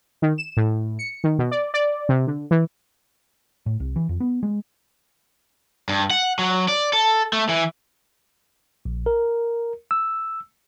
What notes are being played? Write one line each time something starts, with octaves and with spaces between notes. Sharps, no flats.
D#3
E7
A2
C#7
D#3
B2
D5
D5
C3
D3
E3
A2
C2
E3
F2
B3
G#3
G2
F#5
F#3
D5
A4
A3
E3
A#1
A#4
E6